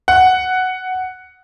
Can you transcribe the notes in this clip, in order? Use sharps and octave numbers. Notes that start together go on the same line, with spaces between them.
F#5